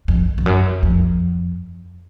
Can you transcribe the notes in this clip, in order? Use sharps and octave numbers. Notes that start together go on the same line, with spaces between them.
F2
F2
F#2
F2